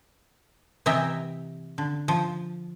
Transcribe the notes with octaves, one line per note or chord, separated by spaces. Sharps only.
C3 E3 D#5 E5 G5 A#5
D3
F3